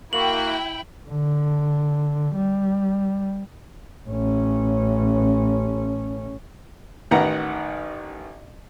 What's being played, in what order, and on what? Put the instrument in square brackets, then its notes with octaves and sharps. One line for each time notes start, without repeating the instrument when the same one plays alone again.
[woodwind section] A#3 F#4 [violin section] E4 G5 [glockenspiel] F#7
[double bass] D3
G3
A1 C#4
[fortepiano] A1 D#3 B4 F#5 A#5